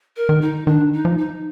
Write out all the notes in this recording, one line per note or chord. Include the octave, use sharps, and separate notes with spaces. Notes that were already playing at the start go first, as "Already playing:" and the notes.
A#4
D#3
D#4
D#3 D4
D#4
F3
D#4